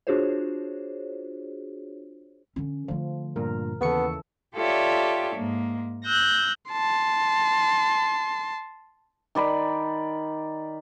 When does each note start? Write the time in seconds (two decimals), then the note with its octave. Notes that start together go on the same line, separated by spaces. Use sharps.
0.07 D4 F4 F#4 G#4 C5 C#5
2.56 D3 C#4
2.88 D3 F3 A3
3.36 G2 A#2 A#4
3.81 D#2 C#3 E3 B3 A4 C#6 C#7
4.55 F4 G4 A4 C#5 D5 E5
5.36 G#2 A#3
6.03 E6 F#6 G6 A#6
6.72 A5 C6
9.35 D#3 D5 B5